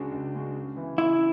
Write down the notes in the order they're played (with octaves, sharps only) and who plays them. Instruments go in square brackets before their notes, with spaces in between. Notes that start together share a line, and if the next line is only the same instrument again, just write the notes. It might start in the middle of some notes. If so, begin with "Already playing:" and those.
Already playing: [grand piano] C#2 C#3 G#3 D4 F#4
C#2
C#3 G#3 D4 F#4
C#3
E3 B3 E4
[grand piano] C#3 [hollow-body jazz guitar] E4